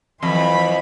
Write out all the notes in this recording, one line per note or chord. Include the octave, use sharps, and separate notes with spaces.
F2 E3 F#3 B5